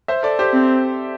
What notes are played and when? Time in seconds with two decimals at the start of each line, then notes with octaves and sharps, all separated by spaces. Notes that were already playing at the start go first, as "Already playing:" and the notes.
0.08 C5 E5
0.23 A4 D5
0.39 G4 C5
0.53 C4